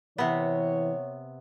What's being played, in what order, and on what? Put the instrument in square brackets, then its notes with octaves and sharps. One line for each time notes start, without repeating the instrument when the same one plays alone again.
[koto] C3 B3 [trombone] E3 [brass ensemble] C#5